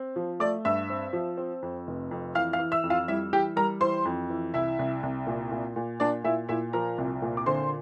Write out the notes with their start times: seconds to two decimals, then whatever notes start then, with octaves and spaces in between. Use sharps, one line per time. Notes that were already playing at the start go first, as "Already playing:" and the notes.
Already playing: C4
0.16 F3
0.40 A3 D5 D6
0.65 G2 E5 E6
0.90 C4
1.13 F3
1.37 C4
1.62 F2
1.87 F1
2.11 F2
2.35 E3 F5 F6
2.53 F5 F6
2.59 E3
2.72 E5 E6
2.84 F2
2.90 F4 F5
3.08 G3 E4 E5
3.33 E3 G4 G5
3.56 G3 A#4 A#5
3.81 E3 C5 C6
4.05 F2
4.30 E3
4.54 C2 E4 E5
4.79 C2
5.03 C2
5.27 A#2
5.51 A#2
5.76 A#2
6.00 A#2 D4 D5
6.24 A#2 E4 E5
6.49 A#2 E4 E5
6.73 F3 A#4 A#5
6.98 C2
7.22 A#2
7.37 D6
7.46 D3 C5 C6